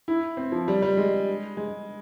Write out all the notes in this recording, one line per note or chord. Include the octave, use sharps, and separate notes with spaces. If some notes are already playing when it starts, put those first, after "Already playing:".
E4
C4
F3
G3
G3
G#3
G#3